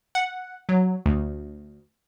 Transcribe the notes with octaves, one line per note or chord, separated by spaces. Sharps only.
F#5
F#3
D2